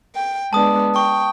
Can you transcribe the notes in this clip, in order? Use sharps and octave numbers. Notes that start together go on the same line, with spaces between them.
G5
G#3 B3 D4 A5 D#6
G5 C#6